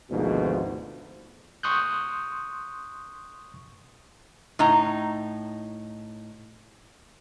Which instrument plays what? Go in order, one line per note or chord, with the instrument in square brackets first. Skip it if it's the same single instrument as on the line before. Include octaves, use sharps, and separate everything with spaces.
[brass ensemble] G#1 D2 G#2 B2 F3
[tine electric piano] C6 C#6 D#6 F#6 G6
[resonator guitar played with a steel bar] A2 D#4 A#5